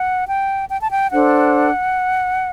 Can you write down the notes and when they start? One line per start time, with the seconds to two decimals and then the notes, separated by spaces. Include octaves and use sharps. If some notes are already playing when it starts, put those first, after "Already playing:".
Already playing: F#5
0.28 G5
0.69 G5
0.80 A5
0.90 G5
1.11 D4 A4 C5 F#5